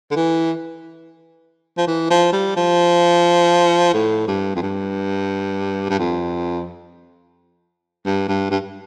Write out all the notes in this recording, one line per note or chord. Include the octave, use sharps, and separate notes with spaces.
D3
E3
F3
E3
F3
G3
F3
A2
G2
F2
G2
G2
F2
G2
G2
G2